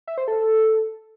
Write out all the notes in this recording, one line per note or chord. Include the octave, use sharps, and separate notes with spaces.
E5
C5
A4